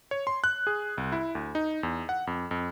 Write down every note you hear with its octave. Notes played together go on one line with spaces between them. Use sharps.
C#5
C6
F#6
G#4
C2
E4
D2
D#4
E2
F#5
F2
F2